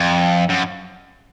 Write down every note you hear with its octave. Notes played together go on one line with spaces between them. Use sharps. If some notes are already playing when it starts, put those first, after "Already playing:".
Already playing: F2
F#2